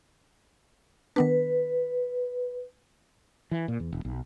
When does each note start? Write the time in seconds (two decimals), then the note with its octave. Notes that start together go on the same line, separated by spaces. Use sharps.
1.16 D#3 B3 D4 B4
3.51 E3
3.68 A#2
3.80 E2
3.92 E1
4.05 B1